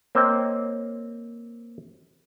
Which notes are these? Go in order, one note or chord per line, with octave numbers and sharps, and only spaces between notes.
A#3 C4 C5 C#5 D#5 G5